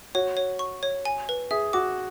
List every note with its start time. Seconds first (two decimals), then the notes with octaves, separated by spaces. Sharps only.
0.15 F#4 C#5
0.37 C#5
0.59 C#6
0.83 C#5
1.05 G#5
1.29 B4
1.51 G#4 E5
1.73 F#4 D6